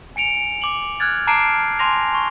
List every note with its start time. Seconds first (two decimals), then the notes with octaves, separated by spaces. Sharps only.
0.16 G#5 C#7 D7 F7
0.62 D6 F#7
1.00 F6 F#6 G#6 A6
1.27 A5 A#5 D6 F6 C7 D7
1.79 G#5 A5 C6 D6 A#6 F7
2.15 C#6